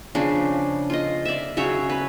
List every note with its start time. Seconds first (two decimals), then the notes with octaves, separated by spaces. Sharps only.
0.15 C#3 F3 D4
0.90 F4 D#5
1.25 D5 E5
1.57 C#3 F#3 C#5 E5
1.90 B4